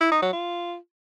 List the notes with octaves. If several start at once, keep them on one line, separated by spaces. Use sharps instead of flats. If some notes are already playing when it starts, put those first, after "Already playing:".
E4
D#4
F#3
F4